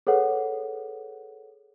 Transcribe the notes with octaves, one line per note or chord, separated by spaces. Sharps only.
G#4 A4 B4 C#5 F#5